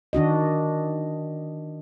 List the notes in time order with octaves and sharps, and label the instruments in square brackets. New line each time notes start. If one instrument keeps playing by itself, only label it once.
[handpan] D#3 D4 F#4 D#5